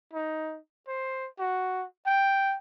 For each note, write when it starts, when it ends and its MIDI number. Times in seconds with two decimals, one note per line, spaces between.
0.13 0.59 63
0.88 1.27 72
1.39 1.85 66
2.06 2.56 79